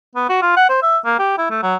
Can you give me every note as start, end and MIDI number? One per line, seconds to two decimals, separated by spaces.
0.15 0.27 59
0.29 0.38 66
0.42 0.53 65
0.57 0.65 78
0.69 0.79 72
0.83 0.98 76
1.05 1.16 58
1.19 1.36 67
1.38 1.47 64
1.50 1.62 57
1.63 1.76 54